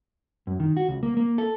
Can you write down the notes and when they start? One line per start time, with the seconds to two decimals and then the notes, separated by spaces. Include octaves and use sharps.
0.47 F#2
0.60 D#3
0.77 F#4
0.88 C#2
1.03 A#3
1.17 A#3
1.38 A4